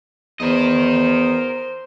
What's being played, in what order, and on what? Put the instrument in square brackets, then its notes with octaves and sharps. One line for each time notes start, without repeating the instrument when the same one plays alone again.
[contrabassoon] E2 [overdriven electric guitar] A#4 D#5 [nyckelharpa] C5